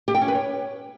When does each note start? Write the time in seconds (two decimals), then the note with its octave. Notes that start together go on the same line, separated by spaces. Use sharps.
0.08 G4
0.15 G5
0.21 C#4
0.28 B4
0.35 C#5